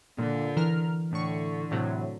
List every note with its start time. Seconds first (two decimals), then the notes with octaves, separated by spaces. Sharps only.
0.18 A#2 D3
0.57 E3 A#4 F6
1.12 A2 D3 C#6
1.71 A2 C3 F#3